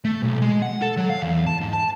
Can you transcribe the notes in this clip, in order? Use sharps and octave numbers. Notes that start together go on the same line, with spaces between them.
A3
B1
G#3
F#5
A4
F#3
F5
E2
A5
G#2
A5